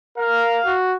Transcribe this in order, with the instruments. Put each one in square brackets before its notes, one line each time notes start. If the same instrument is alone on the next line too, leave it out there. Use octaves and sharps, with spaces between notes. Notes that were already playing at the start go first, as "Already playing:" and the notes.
[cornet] A#4 [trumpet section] F5
[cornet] F#4